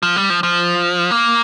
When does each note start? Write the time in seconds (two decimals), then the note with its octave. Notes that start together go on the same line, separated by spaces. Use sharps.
0.03 F3
0.16 G3
0.30 F3
0.43 F3
1.11 A#3